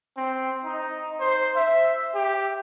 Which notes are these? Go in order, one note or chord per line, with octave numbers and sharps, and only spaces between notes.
C4
D#4
C5
E5
G4